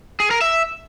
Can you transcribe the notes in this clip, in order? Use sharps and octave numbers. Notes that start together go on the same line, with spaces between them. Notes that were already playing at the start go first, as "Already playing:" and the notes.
G#4
A#4
E5